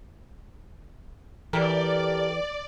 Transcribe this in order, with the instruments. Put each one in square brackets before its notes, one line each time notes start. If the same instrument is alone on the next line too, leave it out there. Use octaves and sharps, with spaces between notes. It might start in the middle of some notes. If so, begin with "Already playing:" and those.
[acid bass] E3 [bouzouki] G4 A4 A#4 [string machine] D5